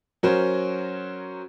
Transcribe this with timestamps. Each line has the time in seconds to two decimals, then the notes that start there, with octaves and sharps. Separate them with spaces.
0.23 F#3 C#4 F#4 A#4 C5